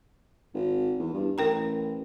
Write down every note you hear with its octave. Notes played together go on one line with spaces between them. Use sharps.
G#1
E2
G2
A1 A#4 G5 A#5